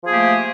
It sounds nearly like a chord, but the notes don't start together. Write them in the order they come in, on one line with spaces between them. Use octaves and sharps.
F3 G#4 A#3 G4 A3